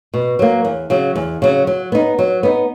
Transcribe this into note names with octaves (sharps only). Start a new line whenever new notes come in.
B2
F#3 A#3
E2
C#3 F#3
E2
C#3 F#3
F#3
B3 D#4
F#3
B3 D#4